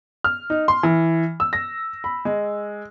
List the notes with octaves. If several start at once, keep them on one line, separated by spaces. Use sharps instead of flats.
F6
D#4
C6
E3
E6
A#6
B5
G#3